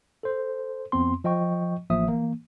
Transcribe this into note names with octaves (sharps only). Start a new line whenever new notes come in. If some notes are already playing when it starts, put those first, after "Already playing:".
A4 C5
F2 B3 C4 C6
F3 D#5 G5 C#6
A1 F3 A#3 E5 D#6
E3 A#3